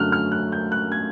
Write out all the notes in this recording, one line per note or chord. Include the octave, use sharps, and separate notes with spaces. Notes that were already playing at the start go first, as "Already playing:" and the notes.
Already playing: F#2 D3 F#3 A3 F6 F#6
F6
F#6
G6
F#6
G#6